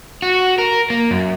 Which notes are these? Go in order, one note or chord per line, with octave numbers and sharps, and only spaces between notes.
F#4
A#4
A#3
F#2